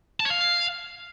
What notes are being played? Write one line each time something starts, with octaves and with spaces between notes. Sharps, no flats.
A5
C#5
F5